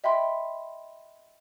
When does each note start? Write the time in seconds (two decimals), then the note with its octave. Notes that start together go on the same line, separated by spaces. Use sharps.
0.04 D#5 E5 G5 B5 C6